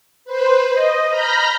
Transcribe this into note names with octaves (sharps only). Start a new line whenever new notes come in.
B4 C5
D#5
A#5 B5 F6 G6 A#6